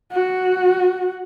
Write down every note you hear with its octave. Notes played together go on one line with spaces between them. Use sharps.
F#4